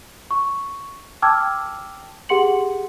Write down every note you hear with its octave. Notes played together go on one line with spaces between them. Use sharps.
C#6
G5 A5 D6 E6 F6 G#6
G4 G#4 F#5 C6 C#7 F#7